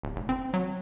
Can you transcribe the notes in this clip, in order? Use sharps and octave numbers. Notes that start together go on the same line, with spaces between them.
D1
F1
C4
F#3